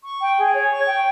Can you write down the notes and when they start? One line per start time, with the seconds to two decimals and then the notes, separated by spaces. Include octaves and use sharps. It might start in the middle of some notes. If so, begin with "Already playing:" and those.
0.04 C#6
0.21 G5
0.38 G#4
0.54 C#5
0.70 C#6
0.87 G5